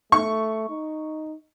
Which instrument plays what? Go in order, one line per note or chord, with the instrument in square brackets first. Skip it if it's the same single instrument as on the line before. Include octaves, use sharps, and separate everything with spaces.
[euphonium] A3 [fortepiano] C#6
[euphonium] D#4